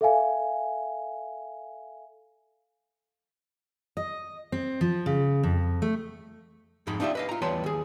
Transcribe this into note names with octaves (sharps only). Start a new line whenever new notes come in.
A4 E5 F5 G#5
D#5
C4
F3
C#3
F2
A3
F2 G#2 G#3 D#4 B5
D4 D#4 F4 G4 D5 E5
B4 D#5 F5
F4 A#5
E2 G3 B4 C#5 A5 C6
D#2 G#4